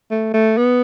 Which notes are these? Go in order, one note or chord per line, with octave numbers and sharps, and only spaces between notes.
A3
A3
B3